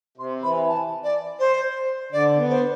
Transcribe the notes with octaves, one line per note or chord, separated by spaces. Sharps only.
C3 C6
E3 B5
A5
D5
C5
D3 D5
B3
C5